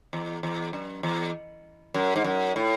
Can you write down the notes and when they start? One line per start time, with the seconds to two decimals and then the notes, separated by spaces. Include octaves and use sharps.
0.13 E2
0.43 E2
0.73 F#2
1.03 E2
1.94 F#2
2.16 G#2
2.24 F#2
2.56 A2